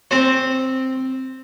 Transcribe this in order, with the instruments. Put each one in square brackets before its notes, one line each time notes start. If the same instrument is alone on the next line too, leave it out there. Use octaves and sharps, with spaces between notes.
[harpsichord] C4 C5